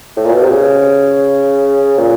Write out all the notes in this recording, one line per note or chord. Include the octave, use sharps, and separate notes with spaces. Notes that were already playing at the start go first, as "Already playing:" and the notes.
A2
A#2
B2
C3
C#3
A#2